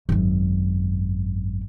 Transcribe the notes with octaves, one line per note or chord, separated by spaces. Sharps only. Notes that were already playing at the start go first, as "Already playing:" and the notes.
G#1 F#2